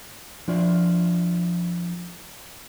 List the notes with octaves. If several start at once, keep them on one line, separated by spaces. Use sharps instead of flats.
F3 D4 E4 F4 D5